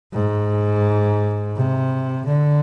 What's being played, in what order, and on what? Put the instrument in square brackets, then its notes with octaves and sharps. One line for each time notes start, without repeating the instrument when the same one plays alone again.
[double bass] G#2
C3
D3